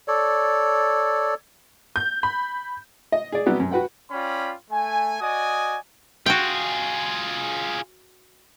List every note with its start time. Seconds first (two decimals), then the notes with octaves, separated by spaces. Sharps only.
0.08 A4 C#5 D5
1.96 G6
2.23 B5
3.12 D#5
3.32 G#4 D5
3.46 C3 F#3 G3 B3 F#4 G4
3.60 F#2
3.71 F#4 B4 F#5 G5
4.11 C#4 F4 D5 G5 B5
4.71 A3 G#5
5.20 F#4 D5 D#5 G#5 D#6
6.26 F4 F#4 G#4 G5